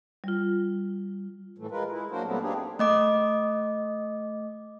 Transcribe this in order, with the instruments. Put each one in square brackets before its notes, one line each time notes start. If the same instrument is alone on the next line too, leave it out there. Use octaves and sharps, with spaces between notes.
[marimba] G3 F4
[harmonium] A2 E3 A3
G#3 F4 A#4 B4
G#3 E4
F#3 A#3 D4 F#4 A#4 C5
A#2 F#3 G3 A3 B3 C4
A#3 C4 D4 D#4 G4 G#4
[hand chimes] A3 D#5 D6